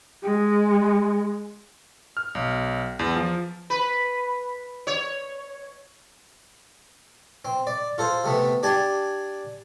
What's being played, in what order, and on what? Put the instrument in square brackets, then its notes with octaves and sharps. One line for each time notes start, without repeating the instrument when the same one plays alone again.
[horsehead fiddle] G#3
[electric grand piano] F6
B1
E2
F3
[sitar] B4
C#5
[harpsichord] C4
D5
F4 A4 C5
C3 A3 B3
D4 G4 G#5 A5